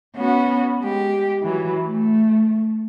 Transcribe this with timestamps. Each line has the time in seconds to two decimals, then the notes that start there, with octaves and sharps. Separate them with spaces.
0.16 B3 C#4 F#4
0.79 G#3 G4
1.42 E3 F#3
1.87 A3